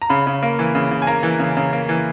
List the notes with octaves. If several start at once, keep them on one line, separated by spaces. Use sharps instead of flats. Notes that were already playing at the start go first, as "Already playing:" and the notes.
A#5
C#3 B5
C#3
A#3
E3
C#3
C#3
G#5
A#3 A#5
E3
C#3
C#3
A#3
E3